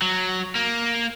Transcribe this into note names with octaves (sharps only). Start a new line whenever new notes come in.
F#3
A#3